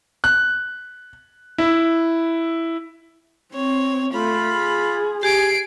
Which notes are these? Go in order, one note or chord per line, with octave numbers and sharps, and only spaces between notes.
F#6
E4
C4 C#5
A3 F4 B5
G#4
G4 G#5 C7 D7